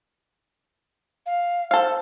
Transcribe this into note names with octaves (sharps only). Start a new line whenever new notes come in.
F5
A4 C5 F5